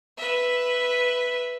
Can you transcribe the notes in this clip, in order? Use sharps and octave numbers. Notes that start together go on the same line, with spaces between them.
B4 E5